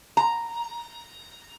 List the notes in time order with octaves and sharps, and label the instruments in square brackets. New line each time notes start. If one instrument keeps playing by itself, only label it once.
[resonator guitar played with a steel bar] A#5